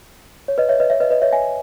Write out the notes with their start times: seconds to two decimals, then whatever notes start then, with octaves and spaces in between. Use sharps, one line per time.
0.48 C#5
0.58 B4 D#5
0.69 C#5 E5
0.80 B4 D#5
0.90 C#5 E5
1.00 B4 D#5
1.10 B4 D#5
1.22 C#5 E5
1.33 E5 G#5